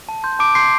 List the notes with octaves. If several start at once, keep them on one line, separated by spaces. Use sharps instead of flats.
A5
C6 G6
A5 D6 D7
C6 G6 C7